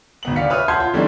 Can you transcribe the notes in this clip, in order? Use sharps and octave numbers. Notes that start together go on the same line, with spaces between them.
G#1 B3 F#7
D2 D5 F5 B6 C#7
B4 C#5 E5 D#6 F6
F#5 A5 C6 G6 G#6 C7
F4
D3 E3 G3 A3 C4 D#4